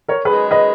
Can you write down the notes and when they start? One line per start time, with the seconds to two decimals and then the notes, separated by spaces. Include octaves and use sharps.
0.08 A#4 C#5
0.25 F#2 D#3 G#3 G#4 B4
0.51 B4 D#5